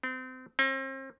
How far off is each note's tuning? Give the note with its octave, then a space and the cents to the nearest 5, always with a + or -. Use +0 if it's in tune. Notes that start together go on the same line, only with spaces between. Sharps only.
C4 -30
C4 +40